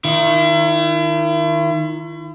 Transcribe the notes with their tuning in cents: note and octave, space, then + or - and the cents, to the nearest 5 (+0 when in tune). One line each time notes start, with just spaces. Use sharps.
D#3 +0 E4 +40